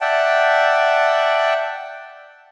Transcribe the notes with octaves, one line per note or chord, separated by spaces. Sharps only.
D5 E5 F#5 G5 A5